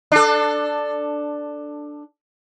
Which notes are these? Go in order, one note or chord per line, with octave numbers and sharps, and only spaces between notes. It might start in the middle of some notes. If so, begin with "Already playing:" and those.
D4 A4